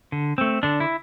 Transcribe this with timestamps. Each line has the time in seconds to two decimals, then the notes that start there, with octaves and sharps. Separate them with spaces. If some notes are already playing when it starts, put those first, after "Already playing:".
0.12 D3
0.38 A3 C4
0.63 D3 D4
0.80 E4